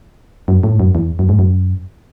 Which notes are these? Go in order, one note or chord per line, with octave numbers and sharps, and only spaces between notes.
F#2
A2
G#2
F#2
E2
F#2
G#2
F#2